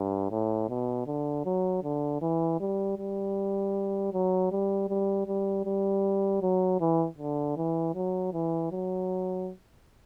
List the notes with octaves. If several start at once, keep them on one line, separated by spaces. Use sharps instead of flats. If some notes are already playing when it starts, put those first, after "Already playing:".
Already playing: G2
A2
B2
D3
F#3
D3
E3
G3
G3
F#3
G3
G3
G3
G3
F#3
E3
D3
E3
F#3
E3
F#3